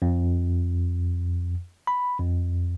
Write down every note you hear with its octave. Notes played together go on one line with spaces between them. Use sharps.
F2
B5
F2